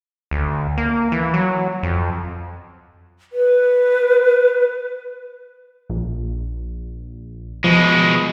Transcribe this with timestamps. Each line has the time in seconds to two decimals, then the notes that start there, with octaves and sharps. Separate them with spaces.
0.31 D2
0.78 A#3
1.12 E3
1.34 F#3
1.83 F2
3.33 B4
5.90 A#1
7.64 B2 F3 G#3